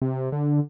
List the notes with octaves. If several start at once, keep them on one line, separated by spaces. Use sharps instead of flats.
C3
D3